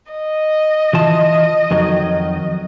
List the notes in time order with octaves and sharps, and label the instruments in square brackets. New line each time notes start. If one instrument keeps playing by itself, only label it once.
[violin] D#5
[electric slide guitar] E3 F4 A5
F2 D#3 F#3